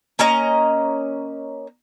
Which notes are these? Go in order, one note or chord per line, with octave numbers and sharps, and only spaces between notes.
A#3 C#4 D#5 A#5